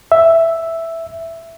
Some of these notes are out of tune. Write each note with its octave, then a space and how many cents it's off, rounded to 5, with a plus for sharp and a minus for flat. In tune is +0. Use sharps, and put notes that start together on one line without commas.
E5 +0